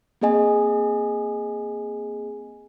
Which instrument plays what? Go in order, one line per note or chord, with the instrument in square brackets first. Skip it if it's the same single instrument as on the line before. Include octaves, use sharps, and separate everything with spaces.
[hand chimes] A#3 C4 G#4 D#5 G#5